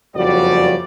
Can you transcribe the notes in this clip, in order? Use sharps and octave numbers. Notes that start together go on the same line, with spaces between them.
F#1 F2 C#3 G3 F#4 D5